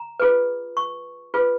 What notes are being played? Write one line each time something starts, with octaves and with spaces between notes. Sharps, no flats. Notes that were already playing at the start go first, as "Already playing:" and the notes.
Already playing: A#5
F4 G#4 B4
C#6
F4 G#4 B4